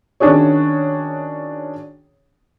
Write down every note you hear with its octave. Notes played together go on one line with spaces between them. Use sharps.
D#3 C#4 D4 F#4 G#4 C#5